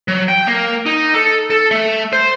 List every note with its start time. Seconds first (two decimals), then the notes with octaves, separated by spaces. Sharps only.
0.08 F#3
0.29 G5
0.48 A#3
0.86 D#4
1.14 A4
1.50 A4
1.71 A3
2.13 C5